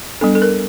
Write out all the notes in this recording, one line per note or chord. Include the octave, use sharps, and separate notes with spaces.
G3 B3 D4 A4
A4
A#4